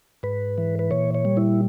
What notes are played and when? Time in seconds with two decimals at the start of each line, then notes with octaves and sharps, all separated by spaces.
0.23 G#2 B4
0.58 E3
0.79 B4
0.91 A#2 C#5
1.15 C#5
1.25 G3
1.37 E4